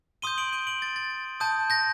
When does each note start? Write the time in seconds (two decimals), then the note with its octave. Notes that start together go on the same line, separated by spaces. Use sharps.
0.22 C6 D#6 G6 D#7 G7
0.38 D7 F#7
0.53 D#7 G7
0.67 D7 F#7
0.82 A6
0.96 A6
1.40 A5 D#6 G6
1.70 G6 A#6